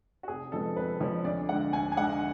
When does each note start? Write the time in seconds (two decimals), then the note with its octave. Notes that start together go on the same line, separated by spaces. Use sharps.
0.23 F#4
0.28 F1 G#4
0.52 F2 F3 G#3 B3 A4
0.76 F1 B4
1.00 F2 F3 G#3 B3 C#5
1.24 D2 D5
1.49 D3 G#3 F#5
1.72 D2 G#5
1.92 G#5
1.97 D3 G#3 F#5